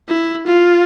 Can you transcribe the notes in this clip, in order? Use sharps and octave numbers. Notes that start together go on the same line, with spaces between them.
E4
F4